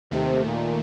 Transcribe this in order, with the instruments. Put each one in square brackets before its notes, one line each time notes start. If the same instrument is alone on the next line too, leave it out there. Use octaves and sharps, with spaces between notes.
[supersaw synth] D#2 D#3 A3 [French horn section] C3
[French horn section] A#2